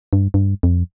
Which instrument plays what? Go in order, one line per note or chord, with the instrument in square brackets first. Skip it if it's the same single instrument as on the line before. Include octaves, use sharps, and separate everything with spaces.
[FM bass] G2
G2
F2